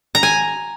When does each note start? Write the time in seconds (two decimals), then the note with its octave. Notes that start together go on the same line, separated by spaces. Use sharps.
0.15 A#5
0.23 G#5